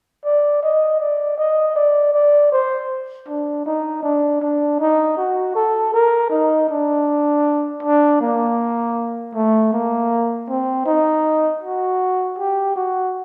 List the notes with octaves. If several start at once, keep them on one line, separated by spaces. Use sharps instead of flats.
D5
D#5
D5
D#5
D5
D5
C5
D4
D#4
D4
D4
D#4
F#4
A4
A#4
D#4
D4
D4
A#3
A3
A#3
C4
D#4
F#4
G4
F#4